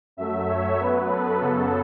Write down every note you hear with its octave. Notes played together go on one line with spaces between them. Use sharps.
F#2 F#3 A3 E5
C#5
F#2 F#3 B3 B4
A4
F#2 C#3 F#3 B3 A4